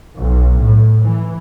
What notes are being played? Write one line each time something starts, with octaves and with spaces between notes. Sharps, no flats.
B1
A2
E3